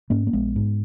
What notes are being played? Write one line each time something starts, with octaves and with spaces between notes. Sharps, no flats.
G#2 A#3 C#4
A#3
A#1 G#3 B3
G#2